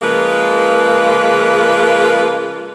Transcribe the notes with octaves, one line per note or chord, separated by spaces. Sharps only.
C#3 F3 G#3 A#3 F4 B4